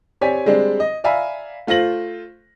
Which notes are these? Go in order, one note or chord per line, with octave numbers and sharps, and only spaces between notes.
C4 G4 C#5 D5 G#5 B6
G3 G#3 C4 D4
D#5
D5 E5 F5 G#5 A#5 B5
A3 F4 C5 A#6 F#7